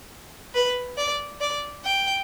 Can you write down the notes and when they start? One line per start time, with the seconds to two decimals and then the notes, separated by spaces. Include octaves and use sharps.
0.55 B4
0.97 D5
1.41 D5
1.85 G5